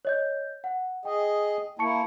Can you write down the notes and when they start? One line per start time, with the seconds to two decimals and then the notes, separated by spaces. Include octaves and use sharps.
0.05 C#5 D#5 G6
0.64 F#5
1.05 G#4 D#5 G5
1.79 A#3 E4 A5 C#6 C#7